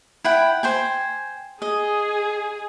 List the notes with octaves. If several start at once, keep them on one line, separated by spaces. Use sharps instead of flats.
E4 F#5 G5
C5 G5 G#5
G#4 D#5